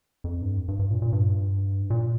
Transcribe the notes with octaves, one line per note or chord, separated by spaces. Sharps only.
F2
G2
G2
G2
A#2
A#2
G2
A#2